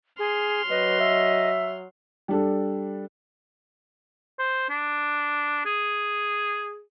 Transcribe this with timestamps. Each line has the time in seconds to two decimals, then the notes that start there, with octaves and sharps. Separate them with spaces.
0.19 G#4 C6 F6
0.70 F#3 B4 D#5
1.00 E5
2.28 G3 D4 A4
4.39 C5
4.69 D4
5.66 G#4